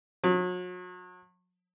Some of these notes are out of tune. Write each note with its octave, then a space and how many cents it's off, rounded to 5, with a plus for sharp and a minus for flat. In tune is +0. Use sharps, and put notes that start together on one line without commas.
F#3 -40